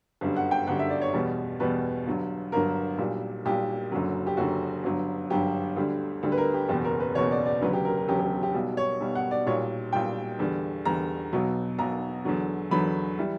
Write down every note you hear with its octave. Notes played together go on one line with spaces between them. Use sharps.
G1 F#2 D3 G3
F#5
G5
G1 F#2 D3 G3 F#5
E5
D5
C#5
E2 B2 G3
E2 B2 G3 B4
G1 G2 F#3
G1 G2 F#3 A#4
B1 A#2 G3
B1 A#2 G3 G4
F#1 F#2 D3 F#3
G4
F#1 F#2 D3 F#3 F#4
G1 G2 F#3
G1 G2 F#3 G4
D2 D3 G3
D2 D3 G3
B4
A#4
G4
F#1 E2 B2 G4
A#4
B4
F#1 E2 B2 C#5
D5
D5
E1 D2 C#3 F#3 B4
G4
A#4
A#4
E1 D2 C#3 F#3 G4
G4
G4
B1 B2 G3
C#5
B1 B2 G3
F#5
D5
B1 A#2 G3 C#5
B1 A#2 G3 G5
E2 D3 G3
E2 D3 G3 A#5
B1 B2 F#3
B1 B2 F#3 A#5
E2 D3 F#3
E2 D3 F#3 B5
E3 G3